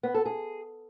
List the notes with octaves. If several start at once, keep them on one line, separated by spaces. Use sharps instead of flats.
B3
A4
G#4